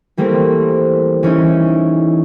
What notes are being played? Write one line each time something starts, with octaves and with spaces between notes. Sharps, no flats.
E3 G3 A3 A#3 C4
E3 C#4 D#4 E4